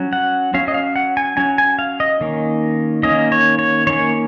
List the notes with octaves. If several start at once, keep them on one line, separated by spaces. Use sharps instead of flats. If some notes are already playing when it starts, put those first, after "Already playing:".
Already playing: F#3 C#4
F#5
F#3 C#4 F5
D#5
F5
F#5
G#5
F#3 C#4 G#5
G#5
F5
D#5
D#3 A#3 C#4
D#3 A#3 C#4 D#5
C#5
C#5
D#3 A#3 C#4 C#5